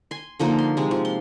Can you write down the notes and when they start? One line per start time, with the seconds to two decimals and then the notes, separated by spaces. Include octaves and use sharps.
0.11 G#5 C6
0.39 D3 F3 A#3 D#4
0.59 C6
0.77 C3 G#3
0.91 F3
1.05 C6